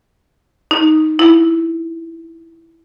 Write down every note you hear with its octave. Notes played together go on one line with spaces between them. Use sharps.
D#4
E4